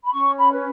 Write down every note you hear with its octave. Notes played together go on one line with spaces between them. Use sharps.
B5
C#4 C#6
B5
B4